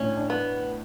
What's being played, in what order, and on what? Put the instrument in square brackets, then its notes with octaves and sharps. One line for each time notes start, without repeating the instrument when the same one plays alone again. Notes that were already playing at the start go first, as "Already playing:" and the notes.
Already playing: [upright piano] A2 D4 [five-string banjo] C#4
[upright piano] D4
[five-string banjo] B3